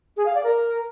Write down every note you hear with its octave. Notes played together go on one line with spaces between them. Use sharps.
G#4
F5
D5
A#4